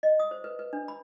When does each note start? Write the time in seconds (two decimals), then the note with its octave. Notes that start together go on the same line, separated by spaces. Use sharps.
0.03 D#5
0.20 D#6
0.31 C5
0.44 B4
0.59 B4
0.73 D4
0.88 B5